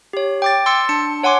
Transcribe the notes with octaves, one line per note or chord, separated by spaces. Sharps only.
G4 C#5
G5 D6 A6
C6 E6 A6 C#7
D4 A5 C#7
C#5 F#5 G#5 C6 D6